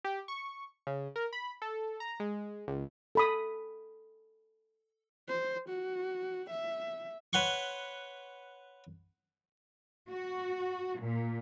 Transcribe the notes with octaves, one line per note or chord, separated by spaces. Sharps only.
G4
C#6
C#3
A#4
B5
A4
A#5
G#3
C#2
A4 B5 D#6
C5
F#4
E5
B4 C#5 F#5 C6 C#6
F#4
A#2